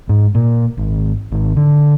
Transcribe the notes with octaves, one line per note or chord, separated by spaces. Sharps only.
G#2
A#2
G#1
G#1
D3